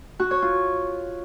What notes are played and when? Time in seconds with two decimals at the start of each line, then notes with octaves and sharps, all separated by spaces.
0.20 F#4
0.31 C#5
0.42 F4